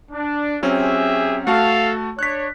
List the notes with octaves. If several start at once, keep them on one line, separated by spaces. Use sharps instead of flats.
D4
F#3 C4 C#4 G4 G#4 E5
A3 F#4 A4 F5 A5
D4 C#5 F#6 B6